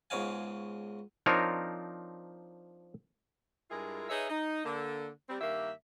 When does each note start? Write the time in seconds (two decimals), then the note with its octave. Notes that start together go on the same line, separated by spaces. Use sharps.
0.10 C#2 G#2 B2 C#5 F5 G#5
1.26 F3 C4 D4 D#4 A#4 C#5
3.70 G2 G#3 E4 F4 G#4 A#4
4.09 D#4 G#4 B4 C#5 E5
4.29 D#4
4.64 D3 A#3
5.28 G3 C4
5.41 G2 D#3 A#3 G4 E5